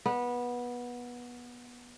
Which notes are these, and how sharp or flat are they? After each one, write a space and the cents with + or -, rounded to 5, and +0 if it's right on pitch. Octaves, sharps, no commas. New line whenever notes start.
B3 -20